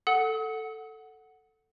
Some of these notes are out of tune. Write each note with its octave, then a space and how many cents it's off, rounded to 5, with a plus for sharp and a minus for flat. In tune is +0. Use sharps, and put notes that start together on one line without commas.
A4 +0 F#5 +0 D#6 +45